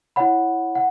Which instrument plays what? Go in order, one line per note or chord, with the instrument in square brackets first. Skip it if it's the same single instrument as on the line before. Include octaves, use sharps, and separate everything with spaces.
[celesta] E4 C#5 F#5 B5
F#5